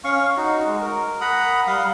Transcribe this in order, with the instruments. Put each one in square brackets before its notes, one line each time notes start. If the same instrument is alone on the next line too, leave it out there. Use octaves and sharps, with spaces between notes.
[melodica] C#4 F5 C#6
D#4 F#4
G#3
A#4
F#5 A#5 B5 D#6
G3 F5 D#6